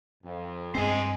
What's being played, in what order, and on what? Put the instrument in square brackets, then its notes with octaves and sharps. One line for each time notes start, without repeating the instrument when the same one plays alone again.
[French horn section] F2
[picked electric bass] G2 C4 [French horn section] G#3 [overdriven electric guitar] C5 D#5 [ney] G#5